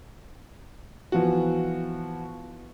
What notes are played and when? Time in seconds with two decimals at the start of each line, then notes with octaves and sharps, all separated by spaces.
1.12 E3 F3 B3 F#4